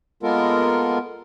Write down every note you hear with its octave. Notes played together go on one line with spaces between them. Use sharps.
G#3 A#3 B3 F4 A4 A#4